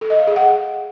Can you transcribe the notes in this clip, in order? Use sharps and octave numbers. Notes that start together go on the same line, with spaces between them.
A4
D#5
F5
G#4
F#5